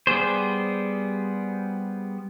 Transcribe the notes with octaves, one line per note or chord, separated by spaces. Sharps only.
G3 B3 G#4 C5